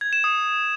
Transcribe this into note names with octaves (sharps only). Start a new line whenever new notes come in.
G#6
E7
D#6